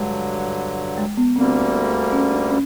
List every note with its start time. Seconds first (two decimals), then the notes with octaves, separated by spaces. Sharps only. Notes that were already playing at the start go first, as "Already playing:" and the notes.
Already playing: G2 D3 F#3 G#3
0.98 G#3
1.17 B3
1.36 D2 D3 G3 A#3 C4
2.12 C#4
2.31 D4
2.50 C#4